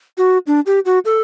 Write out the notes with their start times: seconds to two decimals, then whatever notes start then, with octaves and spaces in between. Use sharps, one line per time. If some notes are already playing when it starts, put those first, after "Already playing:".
0.18 F#4
0.47 D4
0.66 G4
0.85 F#4
1.05 A4